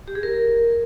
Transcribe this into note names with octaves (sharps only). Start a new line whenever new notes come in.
G4
G#4
A#4